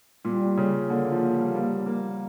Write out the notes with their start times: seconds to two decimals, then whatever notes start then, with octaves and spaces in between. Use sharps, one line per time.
0.25 A#2 G3
0.57 C#3
0.89 D3 A#3
1.12 F3
1.33 G3
1.55 G3
1.86 A#3